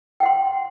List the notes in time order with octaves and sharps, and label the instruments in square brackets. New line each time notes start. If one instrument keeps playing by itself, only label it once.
[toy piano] G5
F#5
C6